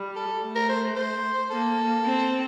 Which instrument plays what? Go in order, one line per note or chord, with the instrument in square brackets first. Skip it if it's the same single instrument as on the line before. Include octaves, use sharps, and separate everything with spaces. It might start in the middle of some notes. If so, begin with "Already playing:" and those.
Already playing: [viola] G3
[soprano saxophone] A4
[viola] A3
[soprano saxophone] A#4
C5
C5
[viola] A#3 [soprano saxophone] A4
[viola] C4